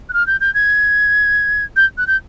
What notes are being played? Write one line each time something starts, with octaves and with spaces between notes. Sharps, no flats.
F#6
F6
G6
G6
G#6
G6
F#6
G6